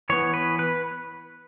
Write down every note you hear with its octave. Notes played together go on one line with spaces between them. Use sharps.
E3 B3 C#5
B4
B4